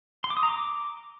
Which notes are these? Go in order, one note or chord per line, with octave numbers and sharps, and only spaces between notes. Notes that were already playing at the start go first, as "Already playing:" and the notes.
C6
D6
D#6
A#5
D6